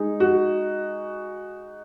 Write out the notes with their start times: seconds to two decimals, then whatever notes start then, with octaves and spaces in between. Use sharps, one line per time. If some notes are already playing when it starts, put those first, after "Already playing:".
Already playing: G#3 D#4 G#4
0.20 F#4